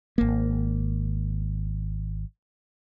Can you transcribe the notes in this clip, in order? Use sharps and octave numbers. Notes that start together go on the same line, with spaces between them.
G#1 A#3